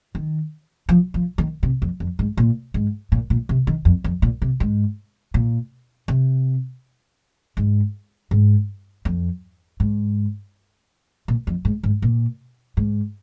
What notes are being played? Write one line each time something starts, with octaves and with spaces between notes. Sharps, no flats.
D#3
F3
F3
D#3
C3
F2
F2
G#2
A#2
G#2
A#2
A#2
C3
D#3
F2
F2
A#2
C3
G#2
A#2
C3
G#2
G#2
F2
G#2
A#2
F2
G#2
G#2
A#2
G#2